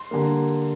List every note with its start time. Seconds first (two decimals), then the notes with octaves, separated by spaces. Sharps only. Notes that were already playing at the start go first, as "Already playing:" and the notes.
Already playing: C6
0.11 D3 G3 A#3